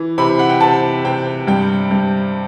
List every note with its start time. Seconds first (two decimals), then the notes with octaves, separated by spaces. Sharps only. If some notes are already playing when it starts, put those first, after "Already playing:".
Already playing: E3
0.18 C3 B5
0.39 F#5
0.49 G5
0.61 C3 A5
1.04 C3 G5
1.47 G2 G5
1.91 G2